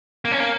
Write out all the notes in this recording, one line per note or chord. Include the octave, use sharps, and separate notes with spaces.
A#3
C#4
A#3